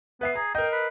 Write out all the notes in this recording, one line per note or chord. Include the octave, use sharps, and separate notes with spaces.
B3 B4 E5 C7
G#4 A#5
A#4 D#5 G5
B4